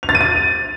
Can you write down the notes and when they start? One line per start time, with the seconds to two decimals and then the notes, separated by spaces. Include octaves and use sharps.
0.03 F7
0.09 A6
0.15 D#7
0.21 A6